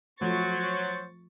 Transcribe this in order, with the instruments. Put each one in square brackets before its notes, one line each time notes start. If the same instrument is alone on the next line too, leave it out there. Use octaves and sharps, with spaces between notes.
[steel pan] F3 A3 [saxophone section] F#3 [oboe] C5 [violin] C#6 A6